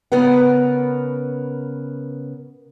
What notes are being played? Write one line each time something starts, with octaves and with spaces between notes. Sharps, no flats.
C#3 B3 A#4 B4 F#5